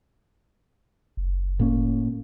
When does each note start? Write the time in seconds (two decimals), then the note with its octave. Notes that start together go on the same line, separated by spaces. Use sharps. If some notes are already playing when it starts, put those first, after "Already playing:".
1.17 F#1
1.59 A2 A#3 C#4